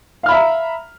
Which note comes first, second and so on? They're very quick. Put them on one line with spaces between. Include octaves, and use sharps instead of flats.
F5 F6 B5 E5 A#5